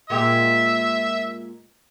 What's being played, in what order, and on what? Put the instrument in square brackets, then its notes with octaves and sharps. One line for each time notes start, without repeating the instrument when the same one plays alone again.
[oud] A#2 G#3 G4 [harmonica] E5